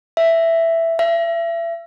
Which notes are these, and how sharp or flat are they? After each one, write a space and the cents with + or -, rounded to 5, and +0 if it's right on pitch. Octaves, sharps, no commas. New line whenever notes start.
E5 +5
E5 +35